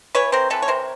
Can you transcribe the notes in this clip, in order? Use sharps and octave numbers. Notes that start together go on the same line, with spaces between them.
E3 B4 C#5
C4 A#4 C5
E3 A4 B4
C#5
C3 A#4 C5